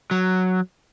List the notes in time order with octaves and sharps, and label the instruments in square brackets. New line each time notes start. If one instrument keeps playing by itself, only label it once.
[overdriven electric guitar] F#3